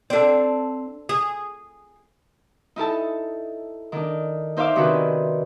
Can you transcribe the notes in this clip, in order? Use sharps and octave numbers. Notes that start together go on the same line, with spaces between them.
C4 D4 A4 D5
G#4
D#4 E4 A4 A5
D#3 D4
D#4 C5 E5 F5 D6
C3 D#3 C#4 D4 F#4 B4